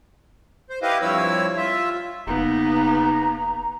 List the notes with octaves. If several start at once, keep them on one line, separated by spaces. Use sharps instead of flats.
C5
E4 G4 B4 D#5 F5
G2 F3 C4 E4 C#5 E6
F4 E5
E1 C#3 A#3 B3 D#4 A#5